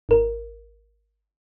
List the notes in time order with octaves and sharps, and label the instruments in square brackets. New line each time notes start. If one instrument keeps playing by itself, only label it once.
[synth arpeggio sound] G#1 A#4